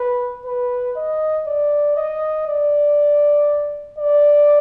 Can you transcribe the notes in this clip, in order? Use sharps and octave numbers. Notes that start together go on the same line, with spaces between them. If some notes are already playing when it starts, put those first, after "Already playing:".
Already playing: B4
B4
D#5
D5
D#5
D5
D5